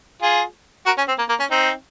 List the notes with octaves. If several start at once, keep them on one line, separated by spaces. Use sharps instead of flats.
F4 G#4
F#4 A#4
C#4
C4
A#3
A#3
C#4
C4 D#4